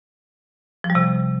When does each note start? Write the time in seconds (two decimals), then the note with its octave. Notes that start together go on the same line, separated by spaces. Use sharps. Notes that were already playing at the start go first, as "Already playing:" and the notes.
0.84 F3
0.90 G3
0.95 C3